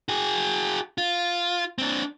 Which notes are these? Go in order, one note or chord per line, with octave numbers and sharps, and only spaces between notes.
F#4 G#4
F4
C4 D4